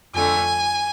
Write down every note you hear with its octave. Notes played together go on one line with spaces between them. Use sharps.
F2 D3 A3 G#5